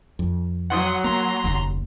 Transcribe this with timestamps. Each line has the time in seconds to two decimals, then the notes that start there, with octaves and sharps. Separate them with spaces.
0.19 F2
0.70 F#3 F#5 C6 D#6
1.04 A#3 A#5 C6
1.44 F1 D#2 C#3